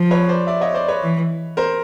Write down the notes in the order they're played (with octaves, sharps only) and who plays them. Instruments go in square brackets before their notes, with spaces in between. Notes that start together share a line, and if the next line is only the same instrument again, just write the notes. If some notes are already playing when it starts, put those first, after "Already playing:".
Already playing: [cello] F3
[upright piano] B4 C#5
C5 D5
D5 E5
C#5 D#5
C5 D5
B4 C#5
[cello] E3
[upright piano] A#4 C5